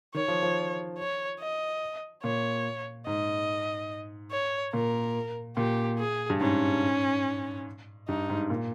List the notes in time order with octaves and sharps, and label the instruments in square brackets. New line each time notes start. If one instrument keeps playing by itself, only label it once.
[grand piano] D#3 [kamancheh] C#5
[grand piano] F3
F3
[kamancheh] C#5
D#5
[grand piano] A#2 [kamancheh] C#5
[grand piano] G#2 [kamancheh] D#5
[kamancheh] C#5
[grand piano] A#2 [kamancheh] A#4
[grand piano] A#2 [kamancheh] G4
[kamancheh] G#4
[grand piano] G2
[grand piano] G#2 [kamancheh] C#4
[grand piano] G2 [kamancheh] D#4
[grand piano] G#2
A#2